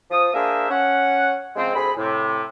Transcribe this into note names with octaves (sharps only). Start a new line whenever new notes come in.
F3 D#6
A#3 D4 G#4 A#4 C5 E5
C#4 F#5
C#3 F3 G#3 C4
D2 C4 G#4 B5
A2 C3